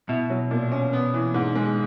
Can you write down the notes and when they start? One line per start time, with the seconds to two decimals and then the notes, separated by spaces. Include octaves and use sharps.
0.09 B2 E4
0.30 F#3
0.51 A#2
0.72 C#4
0.93 B3
1.14 E3
1.34 G#2
1.56 G#3